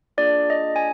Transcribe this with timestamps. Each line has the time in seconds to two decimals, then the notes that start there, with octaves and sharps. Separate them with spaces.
0.18 A#3 D4 F4 G#4 D5
0.50 D#5
0.76 G#5